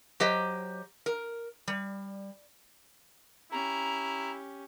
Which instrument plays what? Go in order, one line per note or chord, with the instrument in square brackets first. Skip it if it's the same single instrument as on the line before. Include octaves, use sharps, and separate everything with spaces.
[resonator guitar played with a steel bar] F#3 G4 C5 D#5
A#4
G3
[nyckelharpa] C#4 G4 [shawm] E4 [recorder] A#5